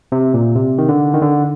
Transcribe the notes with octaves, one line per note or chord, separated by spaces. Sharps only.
C3
A#2
C3
D#3
D3
D#3
D3